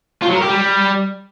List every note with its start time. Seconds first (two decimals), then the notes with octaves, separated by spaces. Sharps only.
0.22 F4
0.29 F#3
0.35 A#4
0.42 G4
0.48 G3